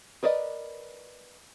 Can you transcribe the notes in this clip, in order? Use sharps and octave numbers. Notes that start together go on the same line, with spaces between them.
A#4 B4 D5 D#5